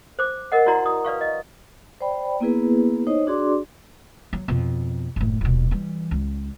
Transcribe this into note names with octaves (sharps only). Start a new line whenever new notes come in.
C5 D6
A#4 D#5 F#5
E4 F#4 D5 A#5 C6
D#6
B4 D5 F5 C#6
D#5
C5 D5 G5 B5
A#3 B3 E4 G#4 B4
D#4 C5 C#5 D#5
D4 F#4 G#4 D5 C6 D6
F#3
F2 B2
F#1 A2
D#1 B2
E3 G3
C#2